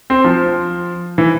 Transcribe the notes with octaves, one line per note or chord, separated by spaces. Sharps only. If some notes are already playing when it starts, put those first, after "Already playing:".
C4
F3
E3